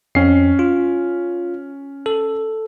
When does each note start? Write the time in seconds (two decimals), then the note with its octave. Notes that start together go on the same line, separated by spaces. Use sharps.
0.15 F2 C#4 C7
0.59 F4
2.06 A4